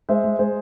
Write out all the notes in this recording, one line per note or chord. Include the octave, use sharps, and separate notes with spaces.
G#3 C5 E5
G#3
G#3 G#4 C5